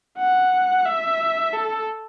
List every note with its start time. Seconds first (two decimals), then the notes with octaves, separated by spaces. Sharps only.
0.18 F#5
0.85 E5
1.53 A4